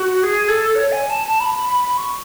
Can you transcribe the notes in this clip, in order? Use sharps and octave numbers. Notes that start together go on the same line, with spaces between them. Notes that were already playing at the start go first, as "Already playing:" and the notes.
Already playing: F#4
G#4
A4
C#5
G#5
A5
A5
B5
B5
B5
B5
C#6